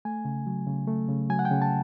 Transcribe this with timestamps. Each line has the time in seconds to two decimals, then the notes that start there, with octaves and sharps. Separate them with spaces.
0.05 A3 G#5
0.25 C#3
0.46 F#3
0.67 C#3
0.87 A3
1.09 C#3
1.29 F#3 G#5
1.39 F#5
1.45 G5
1.51 C#3
1.62 A5